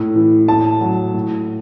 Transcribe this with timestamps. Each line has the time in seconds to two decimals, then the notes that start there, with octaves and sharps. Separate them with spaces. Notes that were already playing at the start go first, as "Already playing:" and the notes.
Already playing: A2
0.16 E3
0.48 A2 A5
0.81 F#3
1.14 A2